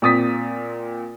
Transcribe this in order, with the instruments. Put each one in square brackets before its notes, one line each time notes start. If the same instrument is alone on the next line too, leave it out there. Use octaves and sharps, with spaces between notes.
[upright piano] A#2 C4 D#6 A6 B6